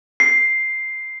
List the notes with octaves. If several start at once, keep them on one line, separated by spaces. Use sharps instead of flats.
C7